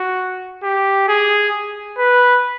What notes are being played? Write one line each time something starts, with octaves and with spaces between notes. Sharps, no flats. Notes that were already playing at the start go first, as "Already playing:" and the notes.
Already playing: F#4
G4
G#4
B4